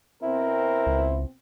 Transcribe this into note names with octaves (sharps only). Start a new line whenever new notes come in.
B2 C4 E4 A#4
C#2